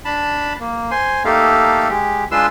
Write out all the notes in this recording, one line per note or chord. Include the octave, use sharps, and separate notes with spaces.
D4 A5 B5
A#3
C5 G#5 C6
A3 A#3 D#4 G4 A4 F5
G#3 G4
G#3 D4 F4 B4 C6 E6